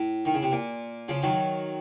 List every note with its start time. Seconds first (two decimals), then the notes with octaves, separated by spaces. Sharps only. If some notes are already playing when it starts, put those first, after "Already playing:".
Already playing: A2
0.25 D#3
0.34 C#3
0.43 C3
0.52 A#2
1.08 C#3 F3
1.23 D#3 F#3